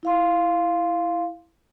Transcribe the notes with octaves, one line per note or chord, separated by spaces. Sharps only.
E4 F5 C6